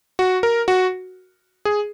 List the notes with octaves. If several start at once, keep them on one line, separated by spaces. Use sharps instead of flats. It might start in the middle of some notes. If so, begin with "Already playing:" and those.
F#4
A#4
F#4
G#4